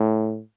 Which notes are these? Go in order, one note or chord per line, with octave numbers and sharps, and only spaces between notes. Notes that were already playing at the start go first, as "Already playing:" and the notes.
Already playing: A2